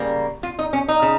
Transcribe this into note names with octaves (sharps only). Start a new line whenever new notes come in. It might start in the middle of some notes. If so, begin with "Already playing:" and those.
Already playing: C#3 G3 A#3
F4
D#4
C#4
D#4
C#3